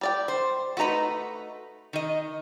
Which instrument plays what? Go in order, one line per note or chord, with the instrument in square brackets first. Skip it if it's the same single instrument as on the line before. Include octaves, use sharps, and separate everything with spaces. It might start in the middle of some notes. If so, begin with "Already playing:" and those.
[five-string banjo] G3 D5 G5
[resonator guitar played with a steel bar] C5
[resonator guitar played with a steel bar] A3 D#4 B4 [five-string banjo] F#4 A#5
[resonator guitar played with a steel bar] D#3 D#5